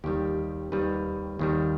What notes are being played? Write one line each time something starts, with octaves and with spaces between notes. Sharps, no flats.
D#2 D#3 G3 G4
D#2 D#3 G3 B4
D#2 D#3 G3